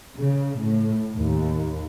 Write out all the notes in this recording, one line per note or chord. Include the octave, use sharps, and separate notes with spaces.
C#3
A2
D#2